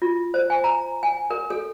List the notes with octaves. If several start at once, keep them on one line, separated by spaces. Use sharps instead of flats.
F4
C5
G#5
A#5
G#5
A#4
A4